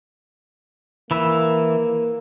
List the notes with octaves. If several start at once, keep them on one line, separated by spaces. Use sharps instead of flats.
E3 A#3 B5 E6